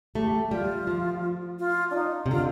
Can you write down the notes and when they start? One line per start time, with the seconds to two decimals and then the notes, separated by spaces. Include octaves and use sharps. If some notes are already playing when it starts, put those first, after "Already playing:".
0.15 A3 G4
0.51 G3 F4
0.87 F3
1.59 F4
1.90 D4
1.95 D#4
2.26 C3
2.31 D3 F4